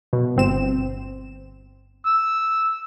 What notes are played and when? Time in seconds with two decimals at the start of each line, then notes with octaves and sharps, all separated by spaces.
0.13 B2
0.36 G1 C4 E7
2.06 E6